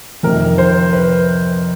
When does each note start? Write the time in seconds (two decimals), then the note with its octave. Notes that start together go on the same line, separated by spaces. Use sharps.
0.23 F2 C3 D#3 A#4
0.58 C5
0.93 B4